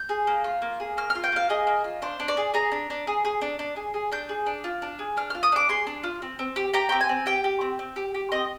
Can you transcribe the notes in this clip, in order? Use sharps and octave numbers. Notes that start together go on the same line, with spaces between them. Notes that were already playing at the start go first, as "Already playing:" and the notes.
Already playing: G6
G#4
A#3
F4
A#3
G#4
A#3 F6
F6
F4
G5
A#3 F5
G#4 D#5
A#3
F4
D4 C5
D4
D5
G#4
G#4 A#5
D4
D4
G#4
G#4
D4
D4
G#4
G#4
D4 G6
G#4
D4
F4
D4
G#4
D4 F6
F4 F6
D#6
D4 D6
G#4 C6
D4
F4
C4
C4
G4
G4 A#5
C4 G5
G#5
C4
G4 G5
G4
C4
C4
G4
G4
C4 D#5